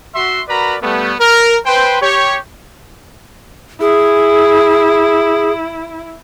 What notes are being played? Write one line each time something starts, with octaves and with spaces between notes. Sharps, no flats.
F#4 E5 C6
F#4 A#4 B4 D5 A#5 B5
G3 A3 B3
A#4
B4 C5 G5
G4 C#5
E4 G#4